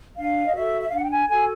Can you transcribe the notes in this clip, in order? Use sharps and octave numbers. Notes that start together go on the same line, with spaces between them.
D4 F5
D#5
F#4 A4 E5
E5
F5
D4 F#5
G5
G#5
F#4 A4 G#5